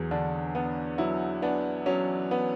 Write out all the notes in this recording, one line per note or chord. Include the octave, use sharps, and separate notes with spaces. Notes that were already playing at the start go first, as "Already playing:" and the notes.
Already playing: E2 F#3 G#4
D3 D4
B3
F#3 E4
B3 D4
F#3 C#4
B3